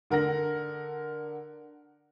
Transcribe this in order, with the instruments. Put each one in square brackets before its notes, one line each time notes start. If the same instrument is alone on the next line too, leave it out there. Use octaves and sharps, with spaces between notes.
[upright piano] D3 A#4 F#5 A#6